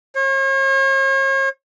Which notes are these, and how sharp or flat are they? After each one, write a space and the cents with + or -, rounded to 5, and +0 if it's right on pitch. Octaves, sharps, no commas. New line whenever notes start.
C#5 -45